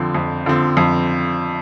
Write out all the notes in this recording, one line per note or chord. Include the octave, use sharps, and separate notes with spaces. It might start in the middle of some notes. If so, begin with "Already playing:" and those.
Already playing: F2 D3 F3 C4
F2
D3 F3 C4
F2